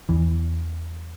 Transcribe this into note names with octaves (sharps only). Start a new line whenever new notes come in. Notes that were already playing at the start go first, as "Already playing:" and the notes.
E2 E3